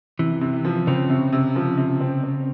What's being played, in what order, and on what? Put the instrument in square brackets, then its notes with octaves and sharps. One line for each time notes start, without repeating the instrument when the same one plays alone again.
[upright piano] C3 [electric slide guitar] E3
[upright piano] C3
F3
[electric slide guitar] C#3 [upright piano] C4
[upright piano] C3
C3
F3
C3
C4
C4